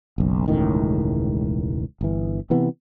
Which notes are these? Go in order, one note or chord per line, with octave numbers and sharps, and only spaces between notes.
F#1 B1
E1 C#2 A2 D#3
G1 E3
C3 E3 B3